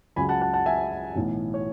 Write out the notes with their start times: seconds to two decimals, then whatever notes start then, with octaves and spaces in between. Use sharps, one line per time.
0.16 C#2 C#3 F#3 G#5 B5
0.29 F#5 A5
0.41 F#5 A5
0.54 F#5 A5
0.66 E5 G#5
1.16 B1 A2 E3
1.54 C#5